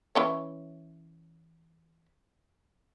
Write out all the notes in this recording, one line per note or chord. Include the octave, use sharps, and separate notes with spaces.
E3 C#4 C#5